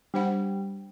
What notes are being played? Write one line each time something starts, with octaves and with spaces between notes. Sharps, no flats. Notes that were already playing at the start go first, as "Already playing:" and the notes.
G3 D4 C5 F#5